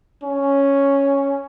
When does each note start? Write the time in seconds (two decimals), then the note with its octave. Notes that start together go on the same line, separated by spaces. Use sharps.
0.23 C#4